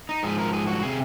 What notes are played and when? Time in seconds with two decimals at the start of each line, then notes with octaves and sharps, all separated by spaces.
0.09 D#4
0.23 G#2 F3 G#4
0.39 A#4
0.53 G#4
0.67 F#4
0.83 C3 G#4